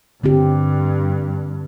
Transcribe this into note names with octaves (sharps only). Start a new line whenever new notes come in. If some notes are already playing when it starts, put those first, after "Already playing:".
G2 D3 C4 G4